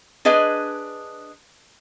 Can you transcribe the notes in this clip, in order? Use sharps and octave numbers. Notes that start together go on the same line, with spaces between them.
D4 G#4 B4 D#5 G#5